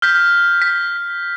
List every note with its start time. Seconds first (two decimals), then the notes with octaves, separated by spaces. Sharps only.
0.02 F6 G6 B6
0.62 B6